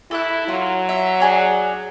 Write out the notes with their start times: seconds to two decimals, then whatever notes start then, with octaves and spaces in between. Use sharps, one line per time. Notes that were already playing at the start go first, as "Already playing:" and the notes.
0.11 E4 A4 E6 F#6
0.48 F#3 F4
0.89 E5
1.20 D4 G#4 C#5